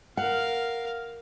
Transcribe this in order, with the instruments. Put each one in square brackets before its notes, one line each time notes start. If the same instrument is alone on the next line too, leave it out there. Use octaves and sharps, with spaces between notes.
[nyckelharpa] A#4 F5 [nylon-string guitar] F#5